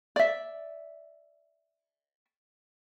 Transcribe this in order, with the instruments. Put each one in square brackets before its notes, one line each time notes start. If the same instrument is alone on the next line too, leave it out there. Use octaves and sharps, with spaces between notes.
[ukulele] D5 E5